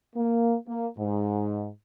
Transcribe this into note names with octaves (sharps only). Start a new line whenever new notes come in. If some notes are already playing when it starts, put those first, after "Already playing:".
A#3
A#3
G#2